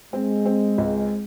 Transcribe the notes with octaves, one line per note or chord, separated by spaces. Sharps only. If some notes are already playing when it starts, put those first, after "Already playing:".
G#3 C4
C4
C#2